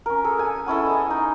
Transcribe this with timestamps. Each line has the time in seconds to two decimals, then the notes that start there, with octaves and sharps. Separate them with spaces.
0.06 C#4 A#4
0.24 G#4 A4
0.39 G#5
0.66 B3 C#4 E4 A4
0.86 D#5 G#5
1.10 D#4